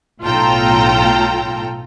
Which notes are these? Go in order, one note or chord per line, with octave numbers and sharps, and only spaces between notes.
B1 A2 F4 A4 G5 A#5